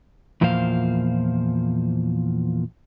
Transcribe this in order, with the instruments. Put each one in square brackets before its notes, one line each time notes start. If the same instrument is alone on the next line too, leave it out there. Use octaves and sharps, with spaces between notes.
[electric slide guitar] E2 A#2 F3 A#3 C5 F5